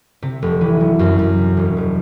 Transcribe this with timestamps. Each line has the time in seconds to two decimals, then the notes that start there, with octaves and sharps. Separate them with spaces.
0.22 C3
0.42 F1
0.61 E3
0.80 F#3
0.99 F#2
1.19 F#2
1.38 C3
1.57 E1
1.77 E1